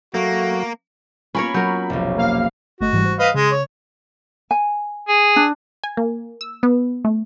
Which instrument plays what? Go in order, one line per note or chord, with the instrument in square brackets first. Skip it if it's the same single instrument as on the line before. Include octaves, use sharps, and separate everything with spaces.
[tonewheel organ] F#3 [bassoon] A3 [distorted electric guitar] A#3 [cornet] F#4
[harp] A#3 B3 F4 [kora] C#4 A#4 C#5 [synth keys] B5
[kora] F#3 A#4 [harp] G6
[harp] F1 B1
[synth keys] A#3 F5 F6
[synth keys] G1 A3 D#5 [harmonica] F#4
[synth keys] G#2 E3 G3
C5
[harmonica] B4 D#5 F5
[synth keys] C#3 [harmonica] G#3
[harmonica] C#5
[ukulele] G#5
[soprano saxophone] G#4
[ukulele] D4
[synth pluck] G#5
A#3
E6
B3
A3